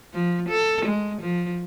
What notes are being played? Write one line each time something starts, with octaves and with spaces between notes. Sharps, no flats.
F3
A4
G#3
F3